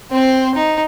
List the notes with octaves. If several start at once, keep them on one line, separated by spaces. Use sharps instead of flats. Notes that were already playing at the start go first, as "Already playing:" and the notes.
C4 C5
D#4